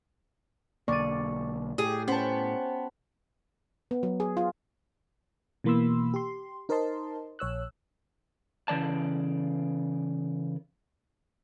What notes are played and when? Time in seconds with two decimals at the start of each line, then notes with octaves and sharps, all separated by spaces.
0.88 B1 D3 A#3 D5 C#6 D#7
1.78 A2 G4 G#4
2.08 B3 C#4 C5 G5 A5
3.91 B3
4.03 F#3
4.20 G#4
4.37 F4
5.64 B2 E3 A#3 B5 C6 E6
6.14 G4 C6
6.69 D#4 A#4 C5 D#5 A5 C6
7.39 A#1 C#5 E6 F#6
8.68 C#3 E3 D5 A5